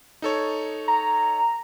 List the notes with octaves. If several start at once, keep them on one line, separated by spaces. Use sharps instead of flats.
D#4 A4 C#5
A#5